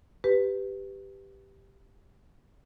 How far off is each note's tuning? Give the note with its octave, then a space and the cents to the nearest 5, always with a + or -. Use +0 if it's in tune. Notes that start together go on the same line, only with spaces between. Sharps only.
G4 +0 B4 +10